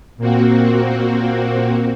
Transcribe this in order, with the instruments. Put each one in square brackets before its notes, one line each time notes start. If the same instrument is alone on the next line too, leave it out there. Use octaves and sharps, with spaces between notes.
[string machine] A#2 A#3 C4 F#4